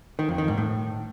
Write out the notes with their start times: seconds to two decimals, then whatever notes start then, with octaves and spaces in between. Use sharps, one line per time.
0.19 D#3
0.29 F2
0.38 D#3
0.48 G#2
0.58 A2